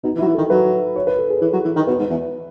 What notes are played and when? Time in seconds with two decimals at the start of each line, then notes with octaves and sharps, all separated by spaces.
0.04 B2 D#4
0.15 E3
0.19 E4
0.22 F#3
0.27 E3
0.34 A4
0.38 D#3
0.50 F#3 B4
0.96 C#5
1.07 B4
1.18 A4
1.30 G#4
1.41 E3 A4
1.53 F#3
1.65 E3
1.76 D#3
1.87 B2 B4
1.99 G#2
2.10 E2